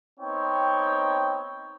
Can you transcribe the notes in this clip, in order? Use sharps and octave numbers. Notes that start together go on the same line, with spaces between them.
B3 C4 D#4 C#5 G5